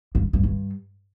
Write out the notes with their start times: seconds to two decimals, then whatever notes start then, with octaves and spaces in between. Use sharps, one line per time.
0.15 G2
0.33 G2
0.44 G2